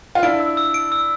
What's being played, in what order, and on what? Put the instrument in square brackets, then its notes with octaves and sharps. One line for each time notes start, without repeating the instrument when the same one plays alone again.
[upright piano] F4
[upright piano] D4 E4 [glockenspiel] D7
[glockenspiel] E6
E6
D7
E6